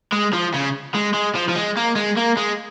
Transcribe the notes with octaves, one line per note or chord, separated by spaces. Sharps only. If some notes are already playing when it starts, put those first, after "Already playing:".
G#3
F3
C#3
G#3
G#3
F3
F3
G#3
A#3
G#3
A#3
G#3